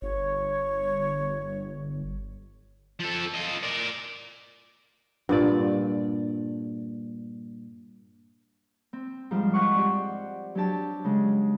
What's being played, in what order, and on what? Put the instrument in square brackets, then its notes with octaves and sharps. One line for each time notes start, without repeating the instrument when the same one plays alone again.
[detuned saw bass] G1 [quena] C#5
[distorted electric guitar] F3 A4
F4 D#5
A#4 D5
[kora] G2 A#2 D5
[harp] C4
G#2 F3 G3 C5 F6
C5 D#5 F#5 C#6
G4 D5
F#3 D4 G4 A5
C#3 G#3